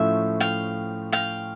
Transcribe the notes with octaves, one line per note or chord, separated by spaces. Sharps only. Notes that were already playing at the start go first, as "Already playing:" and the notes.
Already playing: A2 F3 A3 C#4 F4 E5
F5 G5
F5 G5